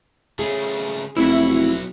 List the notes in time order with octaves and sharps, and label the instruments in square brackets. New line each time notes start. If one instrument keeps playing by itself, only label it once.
[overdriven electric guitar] C#3 A3 [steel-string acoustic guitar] G#4
[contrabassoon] F1 [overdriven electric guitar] B1 F#4 [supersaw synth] E4